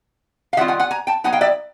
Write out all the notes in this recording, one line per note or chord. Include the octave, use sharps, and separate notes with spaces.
F5
D#3 G3 C4 F4 E5 F#5
F#5 G#5
F#5 G#5
G#5 A#5
G5 A5
F#3 B3 D#4 F#5 G#5
F5 G5
D5 E5